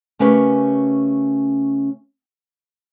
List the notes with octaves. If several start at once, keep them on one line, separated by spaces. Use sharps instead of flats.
C#3 A3 C#4 G4 A#4 B4